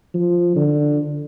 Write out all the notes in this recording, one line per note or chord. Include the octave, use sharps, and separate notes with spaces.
F3
D3